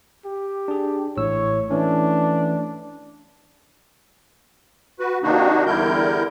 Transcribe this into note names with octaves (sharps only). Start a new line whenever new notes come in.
G4
D4 G#4
A1 A2 C#5 E6
E3 A3 C#4 D4
F#4 B4
C3 D#3 A#3 D4 D#4 F#4
E2 D3 G3 E4 A#4 G6